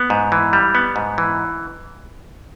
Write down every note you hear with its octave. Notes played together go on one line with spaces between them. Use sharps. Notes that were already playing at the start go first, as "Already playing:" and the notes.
Already playing: B3
G#2
E3
G3
B3
G#2
E3